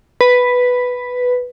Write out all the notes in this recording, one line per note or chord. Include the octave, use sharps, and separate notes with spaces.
B4